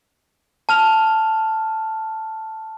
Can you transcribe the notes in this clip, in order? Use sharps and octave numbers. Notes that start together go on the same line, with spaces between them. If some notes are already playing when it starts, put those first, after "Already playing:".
A5 F6 F7